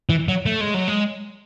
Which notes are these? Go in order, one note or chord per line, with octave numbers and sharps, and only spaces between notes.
E3
F#3
A3
G#3
F#3
G#3